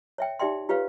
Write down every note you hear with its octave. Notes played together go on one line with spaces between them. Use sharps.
C#5 E5 G5
D#4 G4 D5 E5 G5 C6
F4 G4 B4 C#5 F5